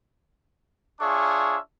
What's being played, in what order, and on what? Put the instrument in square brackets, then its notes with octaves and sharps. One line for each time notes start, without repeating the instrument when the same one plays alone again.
[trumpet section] D4 F4 G#4 C#5 E5 C#6